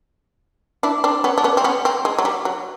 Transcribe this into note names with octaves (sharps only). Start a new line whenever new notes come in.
D4 E4
C4 D4
B3 C#4
D4
B3 C#4
C4
B3 C#4
C4
G#3
F#3
G3
F#3